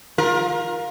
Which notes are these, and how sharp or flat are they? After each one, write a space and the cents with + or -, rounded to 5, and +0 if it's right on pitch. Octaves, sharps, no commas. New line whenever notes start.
F4 +20 A#4 +15